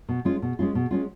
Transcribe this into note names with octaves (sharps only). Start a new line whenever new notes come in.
B2
G#3 C#4 F4
B2
G#3 C#4 F4
B2
G#3 C#4 F4